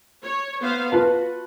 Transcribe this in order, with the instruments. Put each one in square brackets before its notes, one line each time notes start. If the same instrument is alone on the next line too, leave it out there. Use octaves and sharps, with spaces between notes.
[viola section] C#5
B3 C5 F5
[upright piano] F4 B4 A5 [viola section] F#4